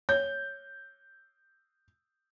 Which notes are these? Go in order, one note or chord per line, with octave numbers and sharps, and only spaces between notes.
C#5 G6